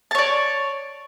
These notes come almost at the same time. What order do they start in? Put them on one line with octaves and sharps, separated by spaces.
A5 C#5 D5